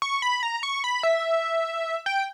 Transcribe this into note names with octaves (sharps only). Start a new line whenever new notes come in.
C#6
B5
A#5
C#6
B5
E5
G5